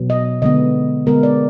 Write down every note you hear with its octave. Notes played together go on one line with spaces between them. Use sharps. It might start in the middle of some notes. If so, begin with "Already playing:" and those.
Already playing: B2 F#3 B3
D#5
D3 G#3 B3 D#5
D3 G#3 B3 A#4
D5